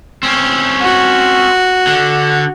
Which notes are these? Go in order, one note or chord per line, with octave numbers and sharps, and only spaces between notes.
C4 C#4
F#4
D3